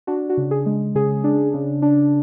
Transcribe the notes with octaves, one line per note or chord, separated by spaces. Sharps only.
D4 F#4
F#4
C#3
G#4
G#3
C#3 G#4
D4
C#3
D4